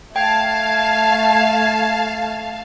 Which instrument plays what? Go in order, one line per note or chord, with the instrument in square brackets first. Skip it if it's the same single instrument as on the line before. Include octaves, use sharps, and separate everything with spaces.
[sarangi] A3 [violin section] F5 A5 [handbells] G5 [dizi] G#6